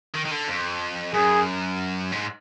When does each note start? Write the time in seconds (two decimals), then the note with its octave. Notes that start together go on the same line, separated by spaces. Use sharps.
0.14 D#3
0.25 D#3
0.31 D3
0.48 F2
1.13 F#2 G#4
2.12 G#2